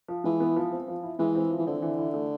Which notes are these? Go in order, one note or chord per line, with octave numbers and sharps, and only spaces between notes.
F3
E3 G#3
B3
F3
C4
F3
E4
E3 G#3
C4
F3
E3
D3 C4
E3
E4
A3